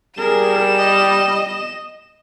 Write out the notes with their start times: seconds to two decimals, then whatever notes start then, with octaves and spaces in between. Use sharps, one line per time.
0.17 G3 G#4 A#4 E7
0.78 D#5